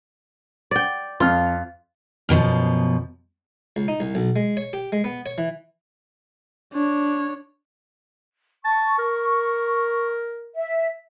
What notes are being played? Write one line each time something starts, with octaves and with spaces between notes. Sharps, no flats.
D5 G5
F2 F4 F6
F#2 B2 E3 F3
C#2
D#4
C2
B1
G#3
C#5
G4
G#3
B3
C#5
E3
D4 C#5
A5 C#6
A#4
E5